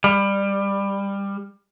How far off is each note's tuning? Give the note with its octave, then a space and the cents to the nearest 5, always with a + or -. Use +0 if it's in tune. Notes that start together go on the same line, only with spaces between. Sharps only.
G3 +20